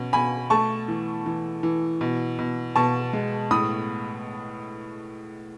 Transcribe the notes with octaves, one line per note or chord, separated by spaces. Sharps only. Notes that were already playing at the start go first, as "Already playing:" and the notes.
Already playing: B2 C#4
B2 G#5 B5
A3 A5 C#6
E3
E3
E3
B2
B2
B2 A5 C#6
G#3
A2 B5 D#6